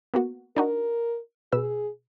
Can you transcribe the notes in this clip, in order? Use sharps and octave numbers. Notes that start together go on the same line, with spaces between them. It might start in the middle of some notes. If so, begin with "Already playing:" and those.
A#3 B3 F#4
D4 D#4 F#4 A#4
B2 G#4 B4 E6